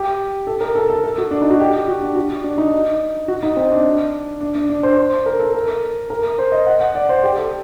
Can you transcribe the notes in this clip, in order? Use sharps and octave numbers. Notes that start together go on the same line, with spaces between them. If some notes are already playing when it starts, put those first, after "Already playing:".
Already playing: G4
A4
A#4
A4
A4
A4
F#4
D4
D#4
F#4
G4
F#4
D4
F#4
D4
D#4
F#4
D#4
C4
D4
D4
D4
D4
C5
C5
A#4
A4
A#4
A#4
C5
D#5
F#5
F#5
D5
C5
G4
A4